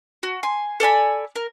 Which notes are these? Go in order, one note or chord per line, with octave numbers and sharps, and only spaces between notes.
F#4
G#5 C6
A4 D5 G#5 B5
A#4